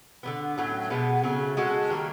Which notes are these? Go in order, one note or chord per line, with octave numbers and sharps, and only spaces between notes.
D3 G3 B3
A2 F#3 A3 C#4
B2 G#3 B3
C#3 F#3 A3 C#4
G#3 C#4 F#4 A4
D#3 G3 A#3